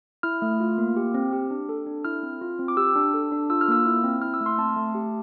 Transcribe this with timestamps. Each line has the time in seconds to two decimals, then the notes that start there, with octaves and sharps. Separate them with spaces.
0.23 E4 F6
0.42 A3
0.60 F4
0.78 A#3
0.96 G4
1.14 C4
1.33 G4
1.51 D4
1.69 A4
1.87 D4
2.05 E4 F6
2.23 C4
2.41 F4
2.59 C4
2.68 D6
2.77 G4 E6
2.96 D4
3.14 A4
3.32 D4
3.50 F4 E6
3.61 F6
3.68 A#3 E6
3.86 E4
4.04 C4
4.22 E4 F6
4.34 E6
4.40 A3
4.46 C6
4.58 C4 A5
4.77 A3
4.95 G4